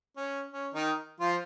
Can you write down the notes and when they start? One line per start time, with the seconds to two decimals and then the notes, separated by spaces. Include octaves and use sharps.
0.17 C#4
0.51 C#4
0.74 D#3 D#4
1.20 F3 F4